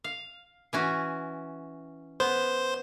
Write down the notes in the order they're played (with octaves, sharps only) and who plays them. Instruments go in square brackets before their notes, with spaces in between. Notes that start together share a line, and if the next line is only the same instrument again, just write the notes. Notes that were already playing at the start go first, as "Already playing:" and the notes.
[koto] F5
E3 C#4 F#4
[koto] B3 [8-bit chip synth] C5